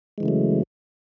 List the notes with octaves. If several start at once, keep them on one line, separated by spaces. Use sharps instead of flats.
C#3 E3 F#3 G#3 A3